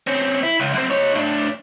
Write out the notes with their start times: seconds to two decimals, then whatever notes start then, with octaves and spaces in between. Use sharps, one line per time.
0.07 C4 C#4
0.43 E4
0.60 C#2
0.73 F#2 C4
0.90 D#4 C#5
1.16 A2 D4